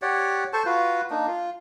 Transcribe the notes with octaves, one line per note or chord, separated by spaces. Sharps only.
G4 C#5 D5 F#5
A4 C5 A5 C#6
F4 F#4 B4
A#3 D4 D#4
F4